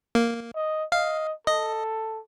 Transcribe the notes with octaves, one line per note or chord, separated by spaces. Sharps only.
A#3
D#5
D#5 F5
A4 D#5